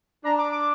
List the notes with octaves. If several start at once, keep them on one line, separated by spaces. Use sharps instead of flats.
D4 A#5
D6
D6